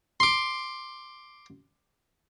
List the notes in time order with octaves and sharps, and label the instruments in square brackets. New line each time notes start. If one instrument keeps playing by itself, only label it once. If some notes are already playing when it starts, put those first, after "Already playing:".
[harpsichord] C6 D6